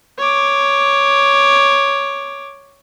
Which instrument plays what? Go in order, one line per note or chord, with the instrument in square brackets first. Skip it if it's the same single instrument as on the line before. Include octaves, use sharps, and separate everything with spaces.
[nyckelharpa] C#5 D6